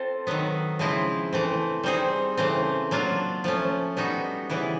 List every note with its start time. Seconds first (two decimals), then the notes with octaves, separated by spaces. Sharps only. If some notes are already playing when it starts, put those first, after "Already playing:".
Already playing: C4 F4 A4 C5
0.27 D#3 F#3 B3
0.79 C#3 F3 G#3 C4 E4
1.33 E3 A3 C4
1.83 G3 C4 D#4 G#4
2.37 C#3 E3 A3 C4
2.91 F#3 A#3 D4 F4
3.44 F3 A3 C#4
3.97 G3 B3 D#4 F#4
4.50 C#3 E3 G3 B3 E4